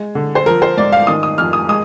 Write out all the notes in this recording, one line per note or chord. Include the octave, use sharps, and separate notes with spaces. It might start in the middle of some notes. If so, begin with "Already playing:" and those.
Already playing: G#3
D3
C5
F3 A#4
C5
G#2 D5
F5
D#3 D#6
D#6
F2 F6
D#6
G#3 D#6